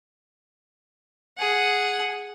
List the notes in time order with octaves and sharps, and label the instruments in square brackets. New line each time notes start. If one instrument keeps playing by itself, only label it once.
[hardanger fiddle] G#4 F#5